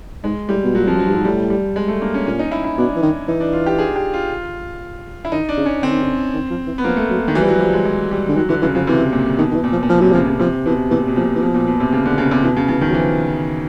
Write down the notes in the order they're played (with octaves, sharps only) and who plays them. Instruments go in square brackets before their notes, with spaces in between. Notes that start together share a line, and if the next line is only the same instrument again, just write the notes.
[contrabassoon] G#2 [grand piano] G#3
[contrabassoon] A2 [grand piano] G3
[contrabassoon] B2
[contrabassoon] A#2 [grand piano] F#3
[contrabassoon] F2 [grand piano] F3
[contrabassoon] F#2 [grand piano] F#3
[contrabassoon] G2
[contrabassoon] G#2 [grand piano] F#3
[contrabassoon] A2 [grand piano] G3
[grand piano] G3
G#3
A3
A#3
C#4
[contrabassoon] A#2 [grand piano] C#4
[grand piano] D#4
E4
E4
[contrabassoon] B2 [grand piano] D4
[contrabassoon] E3
D#3
[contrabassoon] E3 [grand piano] D#4
[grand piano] D4
F4
G4
G#4
G4
F4
E4
[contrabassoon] D#3 [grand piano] D#4
[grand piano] D4
[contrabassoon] C#3
[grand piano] C#4
[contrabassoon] D3 [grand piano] C4
[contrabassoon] D#3
D3
D#3
F3
E3
[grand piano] B3
[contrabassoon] F3 [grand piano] A#3
[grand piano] A3
[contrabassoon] F#3
[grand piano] D#3
[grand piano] E3 [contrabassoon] F#3
[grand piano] G3
[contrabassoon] F3
[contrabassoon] E3 [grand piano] F#3
[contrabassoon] F3 [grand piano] G3
[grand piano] G#3
G#3
G3
[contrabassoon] D3
[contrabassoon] D#3 [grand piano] F#3
[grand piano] D3 [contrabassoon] E3
[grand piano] C#3 [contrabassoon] E3
[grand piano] C#3 [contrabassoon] F3
[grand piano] C3 [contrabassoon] E3
[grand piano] A#2
[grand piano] B2 [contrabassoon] D#3
[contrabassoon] D#3
E3
[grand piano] A#2
[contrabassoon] F3
[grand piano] A#2
[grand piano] B2 [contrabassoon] F3
[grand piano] C3 [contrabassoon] F#3
[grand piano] C#3 [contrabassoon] F3
[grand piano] C#3
[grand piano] C3 [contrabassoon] F3
[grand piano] B2 [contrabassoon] E3
[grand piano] A#2 [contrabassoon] E3
[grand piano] B2
[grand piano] A#2 [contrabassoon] F3
[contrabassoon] E3
[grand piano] B2 [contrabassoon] F3
[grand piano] A#2
B2
C3
C#3
D3
C#3
C3
[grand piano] B2 [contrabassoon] E3
[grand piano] C#3
[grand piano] C#3 [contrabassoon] E3
[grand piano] D#3
[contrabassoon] F#3
[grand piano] E3 [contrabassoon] F3